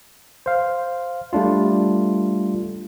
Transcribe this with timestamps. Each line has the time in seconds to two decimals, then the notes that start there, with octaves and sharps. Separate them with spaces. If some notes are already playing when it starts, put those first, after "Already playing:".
0.46 C5 F5
1.33 G3 A3 D4 F4